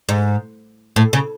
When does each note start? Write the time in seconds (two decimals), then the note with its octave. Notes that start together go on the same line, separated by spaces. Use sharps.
0.09 G#2
0.96 A2
1.13 C#3